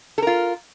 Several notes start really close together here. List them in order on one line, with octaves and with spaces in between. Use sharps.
A4 A#4 F4